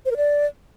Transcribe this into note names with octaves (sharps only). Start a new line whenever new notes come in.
C5
A#4
D5